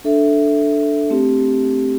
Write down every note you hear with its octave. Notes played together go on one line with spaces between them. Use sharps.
D4 A4 E5
A3 C4 G4